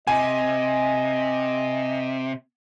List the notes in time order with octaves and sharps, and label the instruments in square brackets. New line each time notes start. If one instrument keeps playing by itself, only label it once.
[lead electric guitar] C3 [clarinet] D#5 [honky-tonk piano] G#5